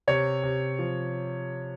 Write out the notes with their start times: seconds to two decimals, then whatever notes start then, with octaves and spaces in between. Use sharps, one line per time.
0.08 C3 C#5
0.43 C3
0.79 F3